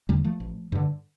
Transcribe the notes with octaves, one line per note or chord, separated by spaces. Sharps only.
E2 D3 G3 A#3
F3 A3
A1
G2 D3